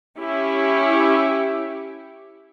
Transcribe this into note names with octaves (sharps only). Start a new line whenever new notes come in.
C#4 E4 G4